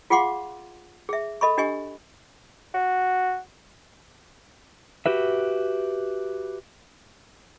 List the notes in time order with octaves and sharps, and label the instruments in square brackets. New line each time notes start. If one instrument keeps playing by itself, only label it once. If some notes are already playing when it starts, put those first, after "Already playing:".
[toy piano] F4 G#4 F5 F#5 C6 D6
G#4 E5
A4 D#5 B5 C#6
D4 G4 D#5 G#5 C#6
[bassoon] F#4
[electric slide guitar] F#4 G4 B4 E5